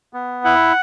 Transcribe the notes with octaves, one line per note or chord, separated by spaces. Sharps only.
B3
E4 F#5